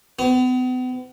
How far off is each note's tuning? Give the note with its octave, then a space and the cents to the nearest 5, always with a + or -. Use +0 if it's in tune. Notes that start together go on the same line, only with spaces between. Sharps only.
B3 +40